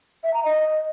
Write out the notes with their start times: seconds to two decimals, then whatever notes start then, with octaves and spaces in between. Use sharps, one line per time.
0.24 E5
0.34 A#5
0.44 D#5